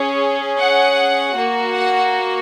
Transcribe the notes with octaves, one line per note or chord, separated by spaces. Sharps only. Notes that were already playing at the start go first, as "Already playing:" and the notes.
Already playing: C#4 G#4 C#5
F#5
A#3 F#4
F#5